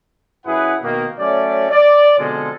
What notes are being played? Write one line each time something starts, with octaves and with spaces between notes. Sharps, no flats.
F#2 E4 G#4 B4 F#5
B2 D#3 A#3
F#3 A3 C#4 D5
D5
B2 D3 F3 G#3 C4 A4